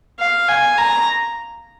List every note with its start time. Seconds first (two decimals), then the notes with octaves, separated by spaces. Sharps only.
0.20 F5
0.49 G#5
0.78 A#5